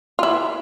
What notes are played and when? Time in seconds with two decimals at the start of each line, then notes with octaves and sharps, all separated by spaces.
0.19 F4
0.23 E4